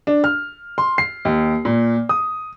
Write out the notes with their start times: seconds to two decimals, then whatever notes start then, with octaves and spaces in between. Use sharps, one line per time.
0.07 D4
0.24 F6
0.78 C6
0.98 C7
1.25 D#2
1.65 A#2
2.09 D#6